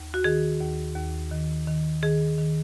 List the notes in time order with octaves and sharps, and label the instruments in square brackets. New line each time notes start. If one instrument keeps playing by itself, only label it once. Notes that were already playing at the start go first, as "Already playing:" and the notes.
Already playing: [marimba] D#2
F#4
D#3 G#4
D#2
D#2
D#3
D#3
D#3 G#4
D#3